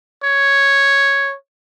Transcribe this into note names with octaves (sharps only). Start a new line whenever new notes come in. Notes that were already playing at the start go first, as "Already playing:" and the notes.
C#5